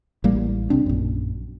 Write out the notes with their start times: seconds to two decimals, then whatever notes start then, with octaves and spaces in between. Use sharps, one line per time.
0.24 A1 G3 A#3
0.70 C2 C3 C4 D4
0.86 A#1 F#2